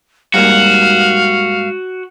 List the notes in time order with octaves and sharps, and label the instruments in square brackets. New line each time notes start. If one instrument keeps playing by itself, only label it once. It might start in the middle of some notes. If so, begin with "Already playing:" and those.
[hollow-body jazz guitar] G#2 G3 A#3 [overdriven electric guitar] F#4 [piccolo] F5